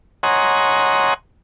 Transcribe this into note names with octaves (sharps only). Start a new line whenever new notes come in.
C#5 D#5 F#5 G#5 A#5 C6